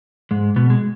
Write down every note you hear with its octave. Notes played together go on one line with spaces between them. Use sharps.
G#2 G#3
B2 B3
G#3